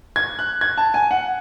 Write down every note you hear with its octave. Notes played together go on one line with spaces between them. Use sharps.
G#6
F#6
G#6
A5
G#5
F#5